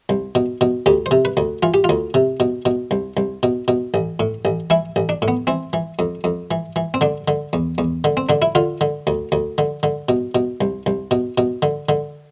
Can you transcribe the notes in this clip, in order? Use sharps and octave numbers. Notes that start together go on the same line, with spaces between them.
C2
B2
B2
D2 G4
C5
C3
B4
D2
E3 F4
G4
F4
D2
C3
B2
B2
C2
C2
B2
B2
A1
A2
A1
E3 E4
A1
D4
A2
B3
E3 C4
E3
F2
F2
E3
E3
C4
D3 D4
D3
E2
E2
D3
C4
D3 D4
E4
D3 F4
D3
D2
D2
D3
D3
B2
B2
C2
C2
B2
B2
D3
D3